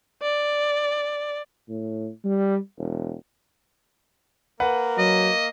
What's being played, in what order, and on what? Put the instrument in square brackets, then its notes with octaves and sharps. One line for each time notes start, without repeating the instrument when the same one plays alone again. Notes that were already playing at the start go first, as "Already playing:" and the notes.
[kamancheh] D5
[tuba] A2
G3
E1
[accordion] A#3 [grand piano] B4 F#5
[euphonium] F#3 [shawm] D#5